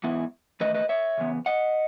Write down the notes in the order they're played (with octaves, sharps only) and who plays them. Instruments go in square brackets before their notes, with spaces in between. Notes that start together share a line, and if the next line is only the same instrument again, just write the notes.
[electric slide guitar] G#2 E3 B3 E4
E2 D#3 A3 B4 D#5
B4 D#5
C#5 E5
C#3 E3 B3
D#5 F#5